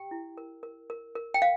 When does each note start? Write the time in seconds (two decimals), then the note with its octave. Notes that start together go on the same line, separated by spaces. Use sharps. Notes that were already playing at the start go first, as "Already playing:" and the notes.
Already playing: G4 G5
0.11 E4
0.38 A#4
0.63 A#4
0.90 A#4
1.15 A#4
1.34 G5
1.42 F5